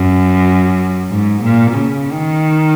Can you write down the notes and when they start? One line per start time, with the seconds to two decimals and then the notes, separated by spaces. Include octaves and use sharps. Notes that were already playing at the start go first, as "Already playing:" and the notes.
Already playing: F#2
1.10 G#2
1.43 A#2
1.78 C#3
2.11 D#3